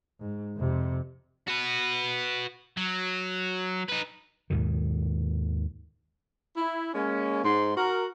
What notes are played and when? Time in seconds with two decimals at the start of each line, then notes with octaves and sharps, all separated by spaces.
0.20 G#2
0.57 F2 C3
1.47 F#4 B4
2.77 F#3
3.88 D#4 B4
4.50 D#2 G#2 B2 D#3
6.56 E4
6.94 G#3 A#3 C#4
7.44 G#2 C6
7.76 F#4 A#4